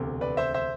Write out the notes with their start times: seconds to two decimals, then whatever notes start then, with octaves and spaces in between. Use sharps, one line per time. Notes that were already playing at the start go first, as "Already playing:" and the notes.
Already playing: E1 D2 C3
0.21 B4 D5
0.37 C5 E5
0.54 C5 E5